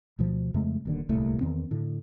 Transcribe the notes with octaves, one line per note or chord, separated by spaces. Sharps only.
D2 B2 F3
F2 C#3 G#3 A3
D#1 D#2 D3
D1 C2 A#2 A3
E2 D#3 C4
A2 D3